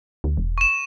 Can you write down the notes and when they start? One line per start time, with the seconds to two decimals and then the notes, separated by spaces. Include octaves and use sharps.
0.24 D2
0.37 E1
0.58 C#6 E7